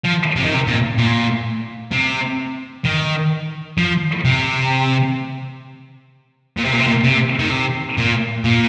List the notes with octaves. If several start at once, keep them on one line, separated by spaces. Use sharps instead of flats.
F3
C3
D#3
C3
A#2
A#2
C3
D#3
F3
C3
A#2
C3
A#2
C3
A#2
C3
D#3
C3
A#2
A#2